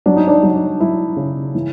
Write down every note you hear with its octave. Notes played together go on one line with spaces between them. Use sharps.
F#3 D4
D#4
D4
F#3
F#3 E4
C#3
E3